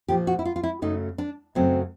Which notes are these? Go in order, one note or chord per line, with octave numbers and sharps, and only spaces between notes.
A#2 F3 A#3 G4
F#4
E4
F4
F4
E4
F#2 C#3 F#3 A3 D#4
D4
F#2 C#3 F#3 A3 C4